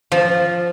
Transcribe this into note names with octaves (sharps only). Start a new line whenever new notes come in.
F3